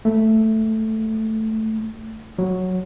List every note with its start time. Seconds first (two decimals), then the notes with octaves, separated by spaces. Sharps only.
0.05 A3
2.39 F#3